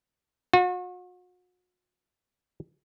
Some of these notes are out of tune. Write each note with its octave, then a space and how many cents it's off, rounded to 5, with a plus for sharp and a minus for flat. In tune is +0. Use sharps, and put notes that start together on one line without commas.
F#4 -40